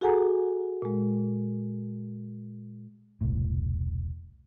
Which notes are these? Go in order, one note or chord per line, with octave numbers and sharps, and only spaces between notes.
F#4 G#4 A4 F#5 G#5 A#5
A#2 G#3
E1 C2 A2